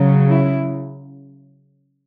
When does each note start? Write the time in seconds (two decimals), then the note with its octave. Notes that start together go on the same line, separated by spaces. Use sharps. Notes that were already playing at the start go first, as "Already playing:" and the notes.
Already playing: C#3 F#3
0.30 E4